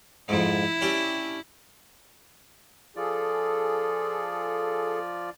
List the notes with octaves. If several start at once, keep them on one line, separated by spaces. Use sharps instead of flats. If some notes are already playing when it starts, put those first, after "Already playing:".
F2 G#2 E4
C#4 D4 G4
F3 F4 G#4 A4 D5